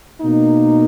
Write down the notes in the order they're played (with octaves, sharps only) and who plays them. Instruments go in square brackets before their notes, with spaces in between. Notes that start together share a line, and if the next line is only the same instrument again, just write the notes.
[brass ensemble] B2 A#3 D#4